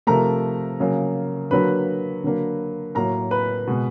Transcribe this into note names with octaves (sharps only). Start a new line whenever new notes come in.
C3 F3 A3 A#4 A#5
C#3 F#3 A#3
D3 F#3 A#3 B4 B5
D3 F#3 A#3
A2 F#3 A#3 A#4 A#5
B4 B5
B2 G#3